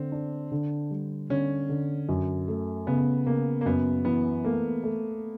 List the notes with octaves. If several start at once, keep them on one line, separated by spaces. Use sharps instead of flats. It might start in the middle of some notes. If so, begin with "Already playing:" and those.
Already playing: D3 C4
D4
D3
G3
D3 C#4
D3
F#2
A3
C#3 B3
C#3 A#3
A#3
F#2 B3
E3 B3
A3 A#3
A3